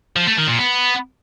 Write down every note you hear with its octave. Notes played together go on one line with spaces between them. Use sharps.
F3
A3
D#3
A#2
B3